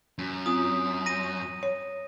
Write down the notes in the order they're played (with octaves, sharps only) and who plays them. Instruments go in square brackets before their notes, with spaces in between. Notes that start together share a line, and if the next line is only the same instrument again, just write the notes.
[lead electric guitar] F#2
[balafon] C4 F4 [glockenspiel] D#6
[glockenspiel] A#6 D#7
[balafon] C#5